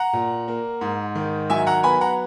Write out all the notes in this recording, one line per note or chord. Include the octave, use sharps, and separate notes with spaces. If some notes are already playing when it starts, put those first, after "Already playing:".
Already playing: F#5 A#5
A#2
A#3
G#2
D#3
F#3 E5 G#5
F#5 A#5
B3 G#5 B5
F#5 A#5